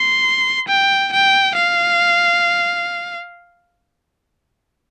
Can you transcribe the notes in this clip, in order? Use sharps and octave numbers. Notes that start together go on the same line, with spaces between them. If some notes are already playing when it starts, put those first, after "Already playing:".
Already playing: C6
G5
G5
F5